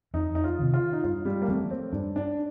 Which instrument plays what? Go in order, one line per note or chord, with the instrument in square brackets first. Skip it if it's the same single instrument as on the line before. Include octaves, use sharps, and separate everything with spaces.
[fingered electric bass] F2 [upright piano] D#4
[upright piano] D#4
F4
[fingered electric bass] C3 D#3
[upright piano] F4
D#4
[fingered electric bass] G2 [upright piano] F4
[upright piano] G3
A#3
[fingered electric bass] F3 C4 [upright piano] A3
[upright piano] C4
[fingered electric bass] G2 [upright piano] D4
[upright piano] D4